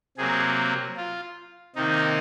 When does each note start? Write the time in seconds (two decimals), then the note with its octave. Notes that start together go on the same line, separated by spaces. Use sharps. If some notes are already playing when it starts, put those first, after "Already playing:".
0.17 C3 F#3 A#3 G#4
0.97 F4
1.75 C3 D#3 A#3 D#4